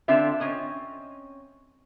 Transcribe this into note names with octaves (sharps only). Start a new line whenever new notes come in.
D3 C4 D4 F4 E5
C4 C#4 D#5